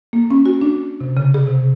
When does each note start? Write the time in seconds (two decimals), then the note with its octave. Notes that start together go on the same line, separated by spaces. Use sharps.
0.13 A#3
0.31 C#4
0.46 F#4
0.61 D4
1.01 C3
1.17 C#3
1.34 G#4
1.47 C3